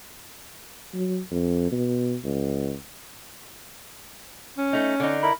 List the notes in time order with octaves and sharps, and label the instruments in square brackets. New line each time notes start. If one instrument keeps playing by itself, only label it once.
[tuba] F#3
F2
B2
C#2
[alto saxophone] C#4
[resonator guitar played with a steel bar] A3 D#4
D3 D#4
[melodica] E4 A#4 B5